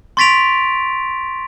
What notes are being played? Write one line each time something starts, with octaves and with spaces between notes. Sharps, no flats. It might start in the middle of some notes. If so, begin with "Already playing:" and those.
C6 C#6 A6 B6 D7 F7